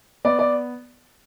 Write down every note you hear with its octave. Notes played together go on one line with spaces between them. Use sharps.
B3 D5
D5